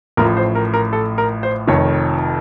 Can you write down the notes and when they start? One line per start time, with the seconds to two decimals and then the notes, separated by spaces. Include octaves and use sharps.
0.17 A1 A2 F3 A#4
0.37 C5
0.55 A#4
0.74 A#4
0.93 A4
1.18 A#4
1.43 C5
1.67 F1 F2 D#3 C#5